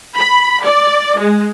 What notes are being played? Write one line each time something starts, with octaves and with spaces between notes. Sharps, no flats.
B5
D5
G#3